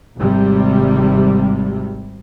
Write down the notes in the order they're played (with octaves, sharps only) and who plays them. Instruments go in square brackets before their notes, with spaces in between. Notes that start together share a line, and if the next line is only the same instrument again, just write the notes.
[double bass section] G#1 C3 G3